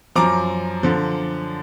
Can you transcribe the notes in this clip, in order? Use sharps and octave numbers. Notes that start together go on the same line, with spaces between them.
F#2 F3 A#5 D6
D3 F3